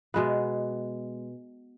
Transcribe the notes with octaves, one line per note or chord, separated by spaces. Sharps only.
B2 G#3 B3